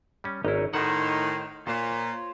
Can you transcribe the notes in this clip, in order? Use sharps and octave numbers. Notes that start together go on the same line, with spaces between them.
G3 C#4
G#1 C#4 D#4 E4
A2 D#3 D#4 C5 F#5
A#2 F4 C5 C#5